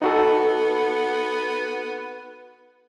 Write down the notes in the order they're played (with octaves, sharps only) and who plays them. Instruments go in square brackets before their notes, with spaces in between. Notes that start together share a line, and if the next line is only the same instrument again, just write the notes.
[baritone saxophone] B3 [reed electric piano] D#4 F#4 A4